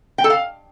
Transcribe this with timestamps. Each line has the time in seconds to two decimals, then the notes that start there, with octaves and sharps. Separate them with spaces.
0.18 G5
0.24 A4
0.30 F5